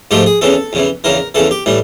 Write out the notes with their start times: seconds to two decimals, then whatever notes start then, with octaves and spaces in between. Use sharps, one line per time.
0.11 G#2 F3 A3 G4
0.26 G#4
0.41 E2 C#3 E3 A4
0.73 E2 C#3 E3
1.04 E2 C#3 E3 A#4
1.35 E2 C#3 E3 A4
1.51 G4
1.66 A2 E3 G3